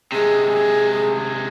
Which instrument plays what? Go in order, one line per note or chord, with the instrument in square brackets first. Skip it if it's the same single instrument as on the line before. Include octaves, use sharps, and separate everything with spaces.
[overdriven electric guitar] C3 G#3 [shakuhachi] G#4